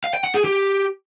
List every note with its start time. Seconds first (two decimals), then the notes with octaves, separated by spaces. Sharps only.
0.04 F5
0.14 G5
0.24 F#5
0.34 G#4
0.44 G4